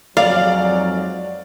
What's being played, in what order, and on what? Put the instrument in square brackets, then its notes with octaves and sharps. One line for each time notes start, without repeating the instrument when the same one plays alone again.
[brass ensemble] F2 G#2 F#3 [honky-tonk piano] D5 [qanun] F5